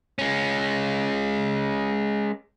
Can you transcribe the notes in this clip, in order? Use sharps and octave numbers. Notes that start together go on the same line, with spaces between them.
G#3 C#4